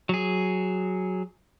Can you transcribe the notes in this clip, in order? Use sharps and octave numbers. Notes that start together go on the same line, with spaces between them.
F#3 G#4